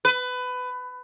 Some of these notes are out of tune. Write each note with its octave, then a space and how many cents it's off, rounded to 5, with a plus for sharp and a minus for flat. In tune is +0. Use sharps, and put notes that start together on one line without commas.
B4 +20